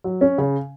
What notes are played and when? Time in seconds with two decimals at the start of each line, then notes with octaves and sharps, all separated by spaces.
0.04 F#3
0.21 C#4
0.38 C#3